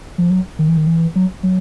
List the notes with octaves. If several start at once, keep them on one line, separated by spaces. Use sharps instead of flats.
F3
F#3
D#3
E3
D#3
E3
F#3
F#3